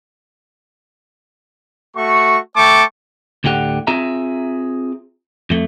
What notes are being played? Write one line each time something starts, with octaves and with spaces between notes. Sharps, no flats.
A3 F#4 C#6
A3 G5 A5 C#6 D6
D2 A2 D3 G4 F#5
C4 F4 G#4 E5 A#5
F2 A3